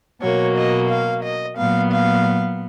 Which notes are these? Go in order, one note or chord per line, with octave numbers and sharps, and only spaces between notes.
B2 F#3 A#3 C#5
D#5
F5
D#5
A#2 F#3 B3 F5
F5